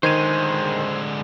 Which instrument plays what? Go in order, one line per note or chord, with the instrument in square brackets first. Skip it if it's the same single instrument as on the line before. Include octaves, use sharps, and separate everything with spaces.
[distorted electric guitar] D3 G#3 [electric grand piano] D#3 G#6 D#7 [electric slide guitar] C5